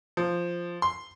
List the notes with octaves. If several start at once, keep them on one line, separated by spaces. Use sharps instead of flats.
F3
C6